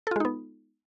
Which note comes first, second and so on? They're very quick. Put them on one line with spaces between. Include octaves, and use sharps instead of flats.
A4 F4 G#3 D#4 B3